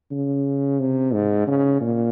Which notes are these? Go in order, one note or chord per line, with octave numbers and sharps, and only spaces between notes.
C#3
C3
G#2
C#3
A#2